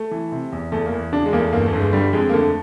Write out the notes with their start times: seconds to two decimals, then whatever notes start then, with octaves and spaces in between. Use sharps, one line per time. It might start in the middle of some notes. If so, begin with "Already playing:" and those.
Already playing: A3
0.11 E3
0.32 C3
0.52 E2
0.72 E2 A3
0.86 A#3
0.92 E2
1.13 C#3 D4
1.26 G#3
1.33 E2 A#3
1.39 A3
1.52 G1 A#3
1.66 A3
1.73 G1
1.80 G#3
1.93 D3 G3
2.13 F2 G#3
2.29 A#3
2.33 D3 A3